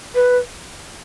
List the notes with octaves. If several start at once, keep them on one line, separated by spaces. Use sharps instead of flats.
B4